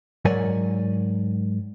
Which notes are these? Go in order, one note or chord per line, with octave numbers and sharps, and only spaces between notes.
G#2 F#3 A#4 C#5 D5 G#5